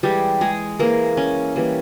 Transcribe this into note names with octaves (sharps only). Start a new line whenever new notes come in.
E3 G3 G#3 G4
G#3 G#4
E3 G#3 A#3 A#4
C#4
E3 G3 A#3